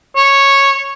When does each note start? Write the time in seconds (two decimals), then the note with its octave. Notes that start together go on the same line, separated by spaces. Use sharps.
0.16 C#5